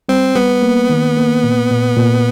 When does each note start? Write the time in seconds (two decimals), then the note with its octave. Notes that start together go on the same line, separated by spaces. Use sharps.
0.08 G3 C4
0.35 G3 B3
0.62 A#3
0.89 D#3
1.17 A#3
1.43 A#2
1.71 A#2
1.97 A#2